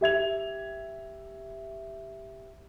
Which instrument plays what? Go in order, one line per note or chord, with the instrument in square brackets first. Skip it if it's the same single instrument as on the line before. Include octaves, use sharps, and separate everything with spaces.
[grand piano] G4 E5 G#6 F7